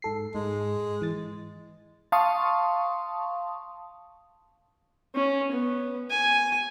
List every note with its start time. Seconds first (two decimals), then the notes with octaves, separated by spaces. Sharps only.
0.02 G#2 A4 C7
0.35 G#2 G#3
1.02 E3 A6
2.12 F5 A5 C6 C#6 D#6
5.15 C#4
5.52 B3
6.10 G#5